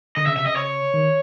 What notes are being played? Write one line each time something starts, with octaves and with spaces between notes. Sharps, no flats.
D3 D#5
C#3 E5
C3 E5
C#3 D#5
C#5
D#3